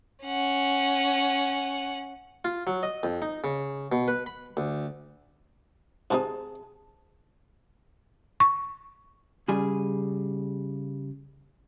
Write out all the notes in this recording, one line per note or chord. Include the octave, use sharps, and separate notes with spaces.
C#4 F#5
F4
F#3
D#5
F2
D#4
C#3
B2
B4
B5
D2
G#2 C3 D#4 G#4 A5
C#6
C#3 G3 G#4